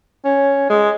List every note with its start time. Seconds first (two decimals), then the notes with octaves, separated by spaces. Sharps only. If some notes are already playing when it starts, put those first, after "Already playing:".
0.24 C#4
0.69 G#3